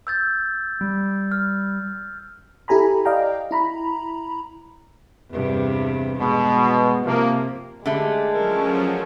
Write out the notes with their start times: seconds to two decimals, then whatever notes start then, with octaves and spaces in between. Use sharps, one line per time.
0.07 E6 G6 A6
0.81 G3
1.31 F6
2.68 E4 G4 A4 G#5 A#5 B5
3.05 D5 D#5 F5 G5 A#5
3.51 E4 A#5 B5
5.30 E2 G2 C3
6.19 B2 G#3
7.05 C3 F3 A#3
7.86 D3 G#3 A3 G4
8.33 F3 F#3 C#4 A4 A#4